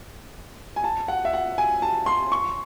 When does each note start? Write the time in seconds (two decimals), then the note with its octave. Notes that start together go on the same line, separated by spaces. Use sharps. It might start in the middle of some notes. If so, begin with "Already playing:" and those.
0.76 G#5
0.84 A5
1.08 F#5
1.25 E5
1.33 F#5
1.58 G#5
1.82 A5
2.06 C6
2.32 C#6